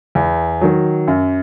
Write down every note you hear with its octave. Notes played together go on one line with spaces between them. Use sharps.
E2
D#3 F#3
F#2